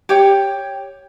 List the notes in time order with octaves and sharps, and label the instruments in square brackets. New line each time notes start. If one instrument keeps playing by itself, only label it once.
[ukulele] G4 C#5 G5